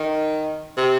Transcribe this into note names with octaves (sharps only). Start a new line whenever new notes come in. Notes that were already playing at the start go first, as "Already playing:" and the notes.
Already playing: D#3
C3